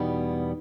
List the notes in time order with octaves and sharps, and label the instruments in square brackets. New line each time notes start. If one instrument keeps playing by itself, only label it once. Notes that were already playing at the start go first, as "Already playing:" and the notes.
Already playing: [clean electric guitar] E2 B2 G3 B3 [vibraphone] D#4